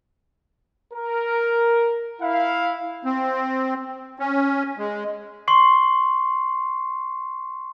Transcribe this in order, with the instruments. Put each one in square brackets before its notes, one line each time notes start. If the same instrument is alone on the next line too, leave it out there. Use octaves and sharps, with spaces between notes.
[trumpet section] A#4
E4 F5
[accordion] C4
C#4
G#3
[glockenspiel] C6 C#6 C7